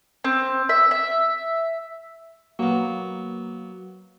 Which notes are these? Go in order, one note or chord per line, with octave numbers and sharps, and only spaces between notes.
C4
E5
E5
F#3 A#3 B3